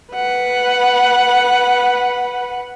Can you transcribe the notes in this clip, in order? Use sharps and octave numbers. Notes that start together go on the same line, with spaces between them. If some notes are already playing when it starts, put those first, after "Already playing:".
B4 F#5